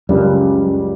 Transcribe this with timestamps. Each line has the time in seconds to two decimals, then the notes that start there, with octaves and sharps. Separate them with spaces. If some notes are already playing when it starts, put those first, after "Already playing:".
0.09 C#2 F#2 C#3 G3 D4